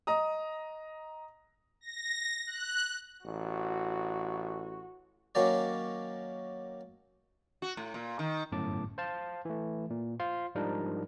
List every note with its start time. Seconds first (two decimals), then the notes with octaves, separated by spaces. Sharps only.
0.07 D#5 A#5 D#6
1.81 A#6
2.46 F#6
3.25 A1 F#4
5.35 D#3 F#3 A#3 C#4 D5
7.62 F#4
7.77 A2
7.94 A#2
8.19 D#3
8.52 G1 F#2 A2 A5 D6
8.98 C5 F5 A5
9.45 E3 A3
9.90 A#2
10.20 F4 C5 F5 C6
10.55 G#2 F3 G3 D4 D#4 A#4